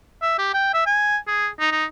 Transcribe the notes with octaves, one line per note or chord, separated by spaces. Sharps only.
E5
G4
G5
E5
G#5
G#4
D#4
D#4